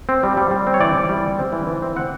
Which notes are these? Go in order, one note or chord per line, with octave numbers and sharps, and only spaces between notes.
C4
G3
G3
G3
C4
C#5
E3 D5
E3
G3
C4
C4
E3
E3
C4
C4 F#5